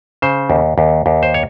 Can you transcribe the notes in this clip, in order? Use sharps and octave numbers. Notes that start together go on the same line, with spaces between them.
C#3 C5
D#2
D#2
D#2
C5
C#5